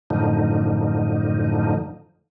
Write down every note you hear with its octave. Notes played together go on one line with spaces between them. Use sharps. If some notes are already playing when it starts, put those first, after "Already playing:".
F#2 A2 D3 F3 D#4